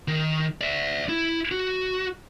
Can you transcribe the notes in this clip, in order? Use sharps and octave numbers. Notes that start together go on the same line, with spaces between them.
D#3
D5 E5
E4
F#4